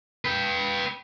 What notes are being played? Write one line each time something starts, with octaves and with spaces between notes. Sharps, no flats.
B4 G5